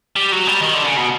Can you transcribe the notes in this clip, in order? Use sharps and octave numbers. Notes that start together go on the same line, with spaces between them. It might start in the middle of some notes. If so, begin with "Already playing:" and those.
G3
F#3
G3
D#3
D3
C#3
B2